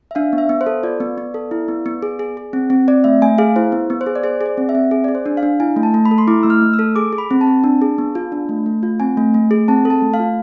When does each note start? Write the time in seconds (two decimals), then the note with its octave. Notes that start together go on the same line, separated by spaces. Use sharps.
0.11 E5
0.15 D4 F5
0.33 B3
0.38 E5
0.49 B3
0.61 C5
0.66 A4
0.83 F4 D5
1.00 B3
1.18 B3
1.34 A4
1.51 E4
1.68 B3
1.86 B3
2.02 G#4
2.19 G#4
2.37 G#4
2.53 C4
2.70 C4
2.88 C4 D5
3.04 A3 E5
3.22 A3 G#5
3.38 G#4 F5
3.56 E4 C5
3.72 B3
3.90 B3
4.01 C5
4.06 G#4
4.15 D5
4.24 G#4 C5
4.41 G#4
4.46 D5
4.57 C4
4.69 E5
4.75 C4
4.91 G#4
5.04 G#4 D5
5.15 C5
5.26 D4
5.37 F5
5.43 D4
5.60 E4 G#5
5.76 A3
5.83 A5
5.94 A3
6.05 B5
6.11 A4
6.18 C6
6.28 E4 D6
6.43 A3 E6
6.50 F6
6.62 A3
6.73 E6
6.79 A4
6.96 G#4 D6
7.13 G#4
7.18 B5
7.31 C4
7.41 A5
7.47 C4
7.64 D4
7.82 G#4
7.98 B3
8.15 F4
8.32 D4
8.49 A3
8.66 A3
8.83 F4
9.00 C4 G#5
9.17 A3
9.34 A3
9.51 G#4
9.68 C4 A5
9.85 A4
9.90 A5
10.02 A3
10.14 F5
10.19 F4